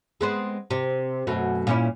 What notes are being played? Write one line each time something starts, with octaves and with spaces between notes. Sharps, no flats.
G#3 B3 C4
C3
F#2 B2 A3
A#2 C#4 E4